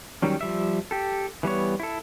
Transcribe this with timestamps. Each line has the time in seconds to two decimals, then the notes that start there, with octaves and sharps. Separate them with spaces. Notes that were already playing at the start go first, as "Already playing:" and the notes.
0.22 D#3 F#3 G3 C#4
0.41 F3 G3 E5
0.91 G4 A4
1.43 E3 G3 B3 C#5
1.80 E4 A4